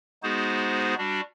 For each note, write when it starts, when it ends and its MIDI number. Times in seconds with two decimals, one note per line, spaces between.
0.23 0.95 56
0.23 0.95 59
0.23 0.95 63
0.23 0.95 66
0.23 0.95 68
0.23 0.95 72
0.98 1.21 55
0.98 1.21 62
0.98 1.21 66